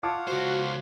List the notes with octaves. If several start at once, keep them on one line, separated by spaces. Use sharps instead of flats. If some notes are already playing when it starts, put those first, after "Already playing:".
F4 C#5 F5 F#5 A5 D6
C#2 F#4 C5